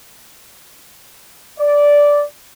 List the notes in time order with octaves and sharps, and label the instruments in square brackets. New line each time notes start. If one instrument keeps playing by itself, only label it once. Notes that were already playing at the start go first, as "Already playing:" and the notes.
[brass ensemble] D5